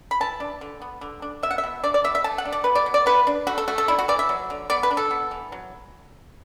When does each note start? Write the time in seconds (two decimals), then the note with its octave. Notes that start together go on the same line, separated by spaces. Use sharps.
0.11 B5
0.20 E3 A5
0.40 D4
0.61 D3
0.82 B3
1.01 D3
1.22 D4
1.43 B2 E5
1.51 F#5
1.58 E5
1.64 B2
1.84 D4 D5
1.94 D5
2.04 B2 E5
2.15 E5
2.24 A3 A5
2.38 F#5
2.45 D4
2.52 D5
2.64 B2 B4
2.75 D5
2.86 B2
2.94 D5
3.06 B3 B4
3.27 D4
3.47 A3 F#4
3.58 A4
3.68 A3 F#4
3.78 A4
3.88 D4 E4
3.99 F#4
4.08 E3 D5
4.19 E5
4.29 F#3
4.50 D3
4.70 B3 D5
4.83 B4
4.91 D4
4.97 A4
5.11 B3
5.31 E3
5.52 F#3